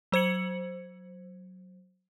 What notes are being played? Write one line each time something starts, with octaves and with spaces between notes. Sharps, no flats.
F#3 C5 G#6 C#7 F#7